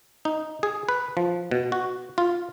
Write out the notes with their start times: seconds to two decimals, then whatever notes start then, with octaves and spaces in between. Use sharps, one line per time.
0.25 D#4
0.63 G#4
0.89 B4
1.17 F3
1.51 B2
1.72 F#4
2.18 F4